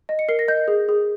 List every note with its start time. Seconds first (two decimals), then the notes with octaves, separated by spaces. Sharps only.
0.09 D#5
0.19 C#7
0.29 A#4 C7
0.39 A#6
0.48 D#5 G6
0.68 G#4
0.89 G#4